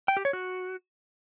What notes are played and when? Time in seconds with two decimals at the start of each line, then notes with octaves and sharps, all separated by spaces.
0.08 G5
0.17 G4
0.25 C#5
0.33 F#4